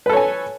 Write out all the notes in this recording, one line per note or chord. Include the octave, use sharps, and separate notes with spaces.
A4 B4 C#5 G#5